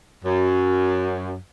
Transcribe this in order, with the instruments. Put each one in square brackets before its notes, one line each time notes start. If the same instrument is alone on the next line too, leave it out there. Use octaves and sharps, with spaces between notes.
[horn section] F#2